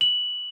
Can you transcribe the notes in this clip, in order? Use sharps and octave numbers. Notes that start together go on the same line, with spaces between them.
F#7